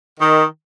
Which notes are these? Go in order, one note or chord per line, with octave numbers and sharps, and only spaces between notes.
D#3